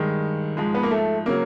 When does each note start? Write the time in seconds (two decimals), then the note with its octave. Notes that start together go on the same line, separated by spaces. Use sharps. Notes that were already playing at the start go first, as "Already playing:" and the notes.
Already playing: G2 D#3 G#3
0.57 G#2 F3 G#3
0.74 B3
0.83 A#3
0.91 A3
1.26 C#3 F#3 A#3